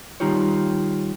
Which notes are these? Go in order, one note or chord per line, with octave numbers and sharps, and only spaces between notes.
D#3 G3 D#4 F4 G4 C#5